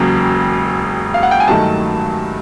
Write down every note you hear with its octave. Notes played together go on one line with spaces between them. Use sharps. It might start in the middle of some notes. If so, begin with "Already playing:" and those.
Already playing: E1 D#2 C#3 F#3
F5
F#5
G5
G#5
G2 D#3 F#3 A3 A5